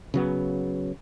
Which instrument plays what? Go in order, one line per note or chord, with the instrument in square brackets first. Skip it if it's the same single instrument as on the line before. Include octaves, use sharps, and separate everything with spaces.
[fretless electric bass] C#3 F#3 B3